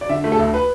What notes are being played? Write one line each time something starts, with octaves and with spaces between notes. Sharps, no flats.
D5
D3 E5
A3
A4
D2
B4